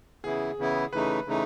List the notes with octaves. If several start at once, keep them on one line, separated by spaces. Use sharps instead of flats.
C#3 E3 B3 E4 G#4
C#3 E3 B3 E4
C#3 E3 A3 D#4 B4
C#3 E3 A3 D#4